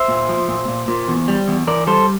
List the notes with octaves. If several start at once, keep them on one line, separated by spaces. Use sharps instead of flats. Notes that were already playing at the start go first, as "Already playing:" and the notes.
Already playing: C5 E5
A#2
F3
A#2
A#2
A#2
E2
G3
E2
E3 A#4 D5
G3 A4 C5